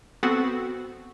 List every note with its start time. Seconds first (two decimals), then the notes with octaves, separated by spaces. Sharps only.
0.23 B3 C4 F#4 A4